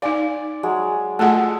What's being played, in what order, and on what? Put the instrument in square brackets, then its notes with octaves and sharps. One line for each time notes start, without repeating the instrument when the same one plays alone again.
[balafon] D#4 F5 [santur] D5 G#5
[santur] F#3 G#3
[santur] G#3 A4 [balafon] A3 F4 F#5